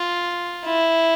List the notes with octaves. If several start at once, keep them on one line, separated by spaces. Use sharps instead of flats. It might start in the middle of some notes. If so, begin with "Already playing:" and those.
Already playing: F4
E4